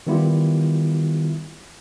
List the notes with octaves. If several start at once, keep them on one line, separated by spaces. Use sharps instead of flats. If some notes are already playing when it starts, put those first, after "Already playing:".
D#3 G3 B3 E4 F4 G4